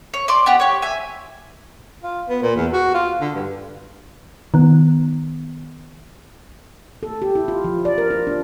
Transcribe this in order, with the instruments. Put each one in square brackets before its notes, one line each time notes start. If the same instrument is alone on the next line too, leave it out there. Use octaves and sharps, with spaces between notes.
[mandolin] C#5
D5 C6 D6
B3 G4 F#5
G4 C#5
E5 G#5
[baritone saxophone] F4
B3
A#2
E2
F#4
F4
D3
G2
[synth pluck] D#3 B3
[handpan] A4
G4
E4
F4
F3
D5
A#4
F4
D4